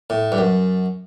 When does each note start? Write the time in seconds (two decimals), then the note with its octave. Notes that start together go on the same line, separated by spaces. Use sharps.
0.10 A2
0.32 G2
0.38 F#2